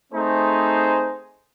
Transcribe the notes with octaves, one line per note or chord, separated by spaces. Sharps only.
A3 C4 D#4 G#4 C5